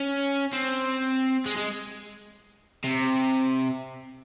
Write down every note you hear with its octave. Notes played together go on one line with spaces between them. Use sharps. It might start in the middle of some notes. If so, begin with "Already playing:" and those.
Already playing: C#4
C4
G#3
G#3
C3